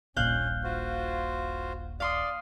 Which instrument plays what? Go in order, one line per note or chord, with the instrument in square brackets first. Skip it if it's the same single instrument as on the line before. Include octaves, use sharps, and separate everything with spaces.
[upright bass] D#1 A#1 [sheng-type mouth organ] C#4 [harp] F5 F#6 G6
[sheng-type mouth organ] F4 F#4 C5
[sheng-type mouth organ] D5 [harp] F5 C6 D#6